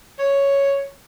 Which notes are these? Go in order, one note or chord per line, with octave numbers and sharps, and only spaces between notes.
C#5